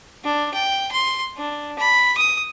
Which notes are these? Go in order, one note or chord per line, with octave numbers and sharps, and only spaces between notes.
D4
G5
C6
D4
B5
D#6